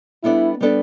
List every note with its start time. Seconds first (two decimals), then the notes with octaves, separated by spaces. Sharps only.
0.24 G3 B3 D4 E4 A4 D5
0.61 G3 B3 D4 A4 D5